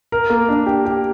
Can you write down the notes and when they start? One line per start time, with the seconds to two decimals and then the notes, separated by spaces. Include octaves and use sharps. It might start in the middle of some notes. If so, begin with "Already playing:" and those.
0.12 A#4
0.30 A#3
0.49 D4
0.66 G4
0.85 G4